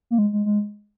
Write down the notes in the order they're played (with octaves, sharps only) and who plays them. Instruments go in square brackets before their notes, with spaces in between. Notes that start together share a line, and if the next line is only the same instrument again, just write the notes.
[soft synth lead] A#3
G#3
G#3
G#3